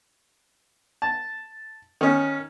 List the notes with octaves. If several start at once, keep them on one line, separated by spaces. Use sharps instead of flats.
A5
D#3 C#4